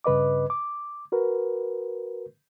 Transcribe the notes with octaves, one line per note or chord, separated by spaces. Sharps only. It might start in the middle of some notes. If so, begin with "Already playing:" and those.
G2 C#3 B4 D#5 D6
D6
F#4 A#4 B4